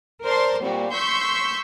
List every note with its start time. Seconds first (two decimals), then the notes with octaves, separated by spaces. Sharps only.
0.23 A#4 C5 D5 A5 C6
0.61 A#2 G3 A#3 C4 F#4
0.91 C6 C#6 E6 G6 B6 C7